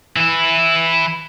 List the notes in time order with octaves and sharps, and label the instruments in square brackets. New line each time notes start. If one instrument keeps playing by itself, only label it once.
[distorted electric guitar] E3 E4